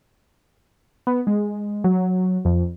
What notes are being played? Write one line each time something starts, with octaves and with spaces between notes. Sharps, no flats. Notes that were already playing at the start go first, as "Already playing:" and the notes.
B3
G#3
F#3
F2